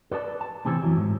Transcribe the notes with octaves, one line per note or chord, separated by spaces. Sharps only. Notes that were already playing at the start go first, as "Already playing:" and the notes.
A4 B4 D5 A5
A5
A2 C3 E3 C4 G#4 A4
F#2 B2 E3 F#3
G#2